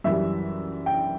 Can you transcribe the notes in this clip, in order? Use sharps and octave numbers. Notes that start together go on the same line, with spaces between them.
F#2 E3 G3 E5
G5